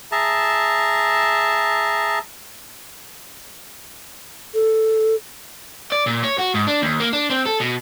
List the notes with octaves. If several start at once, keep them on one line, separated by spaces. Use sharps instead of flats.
G#4 E5 A5 A#5
A4
D5
A#2
C#5
F#4
G#2
D4
D#2
A#3
D4
C4
A4
B2